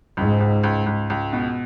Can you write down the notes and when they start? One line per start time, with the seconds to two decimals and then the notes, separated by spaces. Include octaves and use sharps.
0.17 C#2 G#2
0.40 C#2
0.64 C#2
0.86 C#2
1.10 C#2
1.33 B2